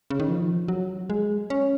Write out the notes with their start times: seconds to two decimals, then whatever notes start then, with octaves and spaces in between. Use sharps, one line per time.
0.10 C#3
0.20 D#3
0.29 F3
0.68 F#3
1.10 G#3
1.50 C#4